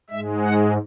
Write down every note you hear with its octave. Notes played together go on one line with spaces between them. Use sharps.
G#2 G#3 E5
F#5